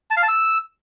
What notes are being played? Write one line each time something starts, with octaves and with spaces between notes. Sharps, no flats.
A5
F5
A5
E6